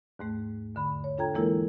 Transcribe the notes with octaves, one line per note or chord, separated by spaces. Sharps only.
D#2 G#2 A3
E2 D3 B5
C#5
D4 F4 A4 G5 A#5 G#6
E3 G#3 A#3 E4 A4 A#4